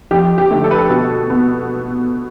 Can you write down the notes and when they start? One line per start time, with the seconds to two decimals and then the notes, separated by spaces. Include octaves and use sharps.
0.11 F2 G4
0.38 G4
0.51 D3 A3
0.64 A4
0.71 B4
0.78 A4
0.90 B2
1.30 B3